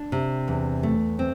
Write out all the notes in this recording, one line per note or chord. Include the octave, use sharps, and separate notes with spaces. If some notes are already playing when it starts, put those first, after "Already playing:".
Already playing: D4
C3
E2
A3
C4